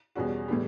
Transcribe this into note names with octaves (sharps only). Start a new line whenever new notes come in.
E2 B2 G3 C#4 F#4
A2 E3 G3